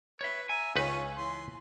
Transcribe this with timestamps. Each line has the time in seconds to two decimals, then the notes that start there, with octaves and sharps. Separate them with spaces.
0.21 B4 C#5 E5
0.49 E5 G#5 A#5
0.76 C#2 C#4 D#4 F4 B4 C#5
1.17 E3 C6